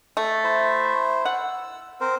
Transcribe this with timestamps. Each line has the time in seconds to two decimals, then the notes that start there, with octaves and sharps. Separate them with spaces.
0.17 A3
0.43 E4 C5
1.25 F#5 E6
2.00 C4 A#4 C5